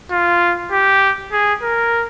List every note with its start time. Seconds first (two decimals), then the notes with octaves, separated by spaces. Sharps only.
0.11 F4
0.72 G4
1.32 G#4
1.62 A#4